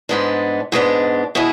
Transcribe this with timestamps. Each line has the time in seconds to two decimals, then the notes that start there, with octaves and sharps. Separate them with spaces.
0.09 G#2 G#3 B3 D4
0.72 G#2 G#3 B3 D4
1.35 B2 G#3 B3 E4